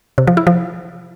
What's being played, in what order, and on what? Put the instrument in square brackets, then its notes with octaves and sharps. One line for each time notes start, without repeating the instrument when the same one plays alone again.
[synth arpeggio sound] C3
F3
E4
F3